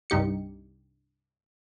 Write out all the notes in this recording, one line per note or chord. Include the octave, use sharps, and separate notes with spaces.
C2 G2 D#4 G4 C#7